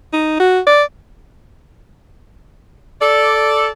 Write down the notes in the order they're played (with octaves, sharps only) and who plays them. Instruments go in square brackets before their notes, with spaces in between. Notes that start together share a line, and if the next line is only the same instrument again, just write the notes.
[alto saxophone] D#4
F#4
D5
[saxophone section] A4 D5